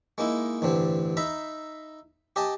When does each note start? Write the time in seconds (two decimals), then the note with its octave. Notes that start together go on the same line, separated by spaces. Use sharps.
0.18 G#3 A#3 D#4 E4
0.62 A1 G2 D3 C4
1.17 D#4 E5 A#5 B5
2.36 G4 D#5 G#5 A5